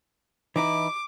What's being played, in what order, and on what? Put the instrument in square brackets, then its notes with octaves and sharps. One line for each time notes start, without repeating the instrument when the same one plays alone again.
[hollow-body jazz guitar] E3 D#4 E4 [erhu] D6